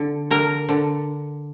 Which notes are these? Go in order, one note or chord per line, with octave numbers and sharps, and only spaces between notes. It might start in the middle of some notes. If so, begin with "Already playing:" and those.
Already playing: D3
D3 A#4
D3